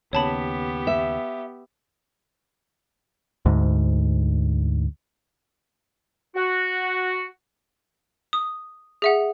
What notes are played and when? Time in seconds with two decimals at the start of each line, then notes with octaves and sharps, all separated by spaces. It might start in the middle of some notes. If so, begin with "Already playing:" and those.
0.13 D#2 C#3 B3 G4 C#5 A5 B5
0.87 E5
3.46 D2 G#2
6.35 F#4
8.33 D#6
9.02 G#4 E5 F#5